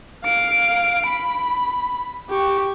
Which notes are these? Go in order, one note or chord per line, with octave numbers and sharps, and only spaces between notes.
F5 D7
B5
G4 C#6